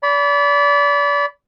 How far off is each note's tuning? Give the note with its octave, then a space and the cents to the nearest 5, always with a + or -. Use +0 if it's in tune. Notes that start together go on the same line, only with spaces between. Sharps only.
D5 -35 B5 +0